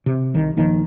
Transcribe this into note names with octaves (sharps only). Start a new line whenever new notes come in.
C3
C2 D#3
A#1 D#2 D#3 F3